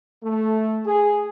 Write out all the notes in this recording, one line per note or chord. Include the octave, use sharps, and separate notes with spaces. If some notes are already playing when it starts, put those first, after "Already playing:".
A3
G#4